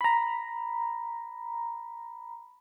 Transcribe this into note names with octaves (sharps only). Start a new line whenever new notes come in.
A#5 B5